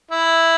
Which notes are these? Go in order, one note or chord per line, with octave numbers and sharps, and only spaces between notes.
E4